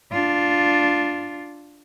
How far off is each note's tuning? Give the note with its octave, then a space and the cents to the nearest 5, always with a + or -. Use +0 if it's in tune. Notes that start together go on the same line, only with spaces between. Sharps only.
D4 +0 F4 +0